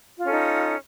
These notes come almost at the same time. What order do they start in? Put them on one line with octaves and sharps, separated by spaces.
F4 C#4 A4 D#4